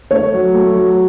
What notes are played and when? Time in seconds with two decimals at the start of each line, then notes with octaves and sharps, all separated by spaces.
0.11 A3 C#5
0.33 F#3
0.54 A3
0.75 F#3